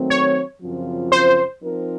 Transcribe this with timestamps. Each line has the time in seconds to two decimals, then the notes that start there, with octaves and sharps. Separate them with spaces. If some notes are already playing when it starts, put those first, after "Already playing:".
Already playing: D#3 F#3 A3 C4
0.10 C#5
0.61 F#2 C#3 F3 C4 F4
1.12 C5
1.63 F3 C4 D#4 A#4